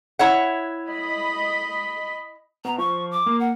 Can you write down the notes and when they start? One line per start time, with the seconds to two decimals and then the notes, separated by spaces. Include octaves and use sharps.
0.19 E4 C#5 F#5
0.89 D#5 B5
2.65 B2 A#5
2.78 F3 C#6
3.11 D6
3.26 A#3
3.40 F#5